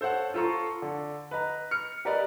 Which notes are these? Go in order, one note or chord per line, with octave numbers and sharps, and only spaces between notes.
A4 C5 C#5 F#5
F4 A4 A#5 C6 C#6
D3
B4 D#5 A#5
F6 C#7
G4 A#4 B4 D5 D#5